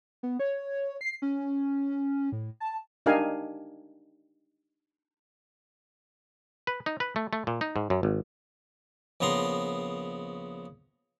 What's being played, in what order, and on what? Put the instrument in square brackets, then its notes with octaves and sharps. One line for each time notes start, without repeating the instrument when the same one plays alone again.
[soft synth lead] B3
C#5
C7
C#4
A2
A5
[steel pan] D4 D#4 G4 A#4 F5 G#5
[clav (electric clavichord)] B4
D#4
B4
A3
A3
A#2
D#4
G#2
F#2
G#1
[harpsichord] A#1 C#3 B3 A#5 C6